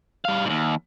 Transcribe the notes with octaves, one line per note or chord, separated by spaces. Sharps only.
G3 F5
D#2 G#2